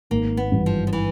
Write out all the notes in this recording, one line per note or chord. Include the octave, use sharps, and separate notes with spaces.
G#1 A#3
B3
G2 E3
F3
F3
E3